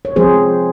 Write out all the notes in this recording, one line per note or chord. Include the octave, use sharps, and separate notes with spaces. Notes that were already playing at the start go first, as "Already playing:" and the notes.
C#5
F3 G#3 C4 G#4 C5